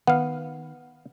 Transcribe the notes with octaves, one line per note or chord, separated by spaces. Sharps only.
D#3 B3 F5 F#5